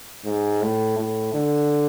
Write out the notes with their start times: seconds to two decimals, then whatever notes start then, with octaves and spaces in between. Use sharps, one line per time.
0.25 G#2
0.62 A2
0.98 A2
1.34 D3